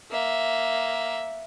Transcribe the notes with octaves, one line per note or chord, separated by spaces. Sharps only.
A#3 E5